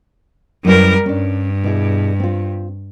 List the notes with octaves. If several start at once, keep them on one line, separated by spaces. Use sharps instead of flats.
F#2 G3 E4 A#4 B4
G2 C#4 D4
B2 E4 G#4
C4 F4